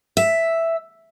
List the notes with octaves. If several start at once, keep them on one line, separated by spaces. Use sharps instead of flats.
E5